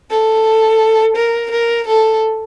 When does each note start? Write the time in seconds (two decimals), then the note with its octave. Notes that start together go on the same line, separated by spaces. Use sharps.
0.10 A4
1.16 A#4
1.50 A#4
1.87 A4